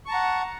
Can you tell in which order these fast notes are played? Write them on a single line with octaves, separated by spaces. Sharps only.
C#6 A5 A#5 F#5